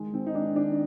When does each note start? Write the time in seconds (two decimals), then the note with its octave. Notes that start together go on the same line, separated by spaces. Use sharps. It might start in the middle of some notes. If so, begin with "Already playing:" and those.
Already playing: D#3 G#3
0.13 D#3 C4
0.27 D#4
0.34 G#3 D4
0.56 D#3 D4